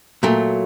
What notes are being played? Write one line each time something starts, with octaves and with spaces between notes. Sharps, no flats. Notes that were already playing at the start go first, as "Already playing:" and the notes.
A#2 F#3 A3